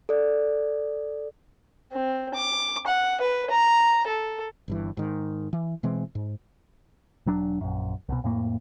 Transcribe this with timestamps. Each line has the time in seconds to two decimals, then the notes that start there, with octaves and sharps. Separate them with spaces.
0.09 A4 D5
1.92 C4
2.34 D6
2.87 F#5
3.21 B4
3.50 A#5
4.08 A4
4.68 G1 G2 E3
4.97 G#2 D#3
5.53 E3
5.83 B2 E3 G#3 C4
6.15 G#2
7.26 E1 F#3 D4
7.61 A#1 F#2
8.09 C2 B2
8.24 F2 A2 A#3